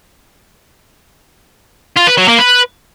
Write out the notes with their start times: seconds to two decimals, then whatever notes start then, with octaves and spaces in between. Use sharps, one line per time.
1.97 F4
2.08 B4
2.18 F#3
2.29 A#3
2.39 B4